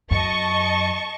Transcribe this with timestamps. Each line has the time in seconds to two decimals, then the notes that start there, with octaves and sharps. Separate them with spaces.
0.11 F#2 D#5 A5 C#6